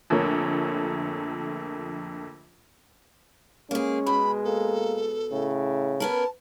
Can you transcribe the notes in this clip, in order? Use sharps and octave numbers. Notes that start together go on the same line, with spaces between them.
A#1 F2 D3 A3 A#4 C#5
G#3 A#3 C#4 G#4
B2 B5
A#3 A4
A2 C#3
B3 C#4 A#4 A5